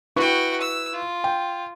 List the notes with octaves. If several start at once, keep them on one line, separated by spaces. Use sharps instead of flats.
E4 F#4 B4 G5 C#6
E6
F4
G5